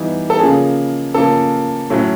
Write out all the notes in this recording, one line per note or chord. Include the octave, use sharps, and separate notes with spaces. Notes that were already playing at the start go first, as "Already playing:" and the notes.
Already playing: E3 G3 B3 D#4
A4
C#3 F3 A#3 G#4
C#3 F3 A#3 A4
A2 F#3 A3 C#4 E4